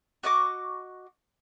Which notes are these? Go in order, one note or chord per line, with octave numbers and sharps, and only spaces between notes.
F#4 D#5 C#6 D6